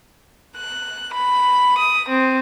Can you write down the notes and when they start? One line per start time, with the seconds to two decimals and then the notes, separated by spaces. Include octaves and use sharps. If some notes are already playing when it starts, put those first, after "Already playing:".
0.58 F#6
1.13 B5
1.79 D#6
2.08 C4